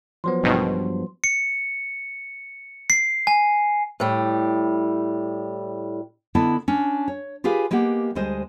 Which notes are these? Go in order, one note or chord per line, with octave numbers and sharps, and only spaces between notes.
F3 F#3 B3 C5 C6
A1 G2 B2 D#3
C#7
C7
G#5
A2 G3
D3 B3 E4 D#5 A5
C#4 D4
C#5
F4 G4 G#4 B4 F5
G#3 A#3 B3 G4 F#5
D2 G3 G#3 C5 D#5